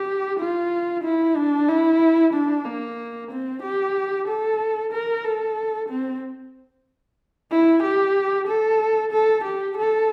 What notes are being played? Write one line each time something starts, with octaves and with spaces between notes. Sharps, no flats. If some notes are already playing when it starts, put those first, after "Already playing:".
Already playing: G4
F4
E4
D4
E4
D4
A#3
C4
G4
A4
A#4
A4
C4
E4
G4
A4
A4
G4
A4